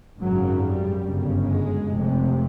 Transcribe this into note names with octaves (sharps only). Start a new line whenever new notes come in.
G#1 F#2 C#3 F#3
G3
G1 F#2 C#3
G#3
F1 F2 C3